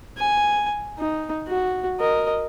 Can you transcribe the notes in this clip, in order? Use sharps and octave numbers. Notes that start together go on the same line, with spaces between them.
G#5
D#4
F#4
A#4 D#5